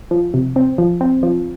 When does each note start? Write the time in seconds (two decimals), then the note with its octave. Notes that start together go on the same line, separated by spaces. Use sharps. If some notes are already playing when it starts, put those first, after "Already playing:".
0.11 F3
0.34 C3
0.56 C4
0.78 F3
1.01 C4
1.23 F3